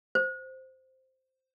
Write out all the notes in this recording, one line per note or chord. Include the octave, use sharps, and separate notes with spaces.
C5